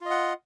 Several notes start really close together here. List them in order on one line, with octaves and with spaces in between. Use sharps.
F4 D#5 F#5